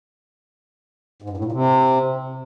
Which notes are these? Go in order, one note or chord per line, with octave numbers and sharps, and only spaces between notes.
G#2
G2
A2
A#2
C3